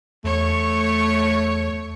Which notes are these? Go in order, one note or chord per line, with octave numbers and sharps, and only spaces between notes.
E2 A3 C#5 C#6